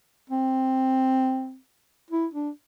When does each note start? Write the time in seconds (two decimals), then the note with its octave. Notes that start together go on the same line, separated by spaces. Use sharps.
0.30 C4
2.10 E4
2.34 D4